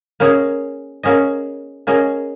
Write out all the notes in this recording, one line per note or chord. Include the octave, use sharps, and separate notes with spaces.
A#3 C#4 G#4 D#5
A#3 C#4 G#4 D#5
A#3 C#4 G#4 D#5